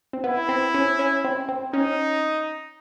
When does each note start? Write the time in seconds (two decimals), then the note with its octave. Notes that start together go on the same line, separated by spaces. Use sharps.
0.13 C4
0.24 B3 E4
0.49 C4
0.74 C#4
0.99 C#4
1.25 C4
1.49 C4
1.73 C#4 D#4